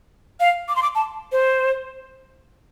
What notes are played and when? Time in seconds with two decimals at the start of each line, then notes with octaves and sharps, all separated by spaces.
0.40 F5
0.68 D6
0.76 C6
0.83 D6
0.95 A5
1.32 C5